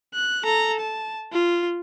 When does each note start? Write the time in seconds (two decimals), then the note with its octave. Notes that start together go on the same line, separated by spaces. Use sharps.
0.14 F#6
0.44 A4 A#5
0.80 A5
1.33 F4